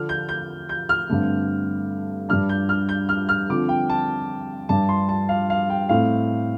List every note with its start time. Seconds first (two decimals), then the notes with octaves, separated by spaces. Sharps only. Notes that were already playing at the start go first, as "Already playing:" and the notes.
Already playing: D3 F3 D4 F6
0.09 G6
0.29 G6
0.69 G6
0.89 F6
1.09 G2 D3 A3 C4
2.29 G2 G3 D4 F6
2.49 G6
2.69 F6
2.89 G6
3.09 F6
3.29 F6
3.49 D3 F3 C4 D6
3.69 G5
3.90 A5
4.69 G2 G3 D4 A5
4.89 C6
5.09 A5
5.29 F5
5.50 F5
5.70 G5
5.89 A2 A3 C4 F5